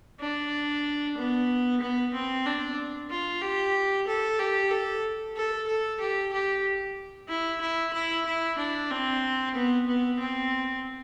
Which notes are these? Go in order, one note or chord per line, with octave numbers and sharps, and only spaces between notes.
D4
B3
B3
C4
D4
F4
G4
A4
G4
A4
A4
A4
G4
G4
E4
E4
E4
E4
D4
C4
B3
B3
C4